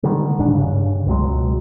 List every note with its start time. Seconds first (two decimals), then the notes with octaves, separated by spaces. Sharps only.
0.03 D3 D#3 G3 G#3
0.39 D#1 G#2 D4
0.54 G2 C#3
1.06 C#2 B2 F#3 G#3